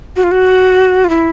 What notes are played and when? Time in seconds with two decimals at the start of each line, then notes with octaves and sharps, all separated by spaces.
0.16 F#4
0.23 F4
0.31 F#4
1.04 F4
1.09 E4